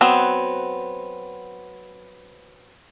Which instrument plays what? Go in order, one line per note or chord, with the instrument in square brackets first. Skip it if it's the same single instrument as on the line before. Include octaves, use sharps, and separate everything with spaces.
[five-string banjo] F#3 B3 C4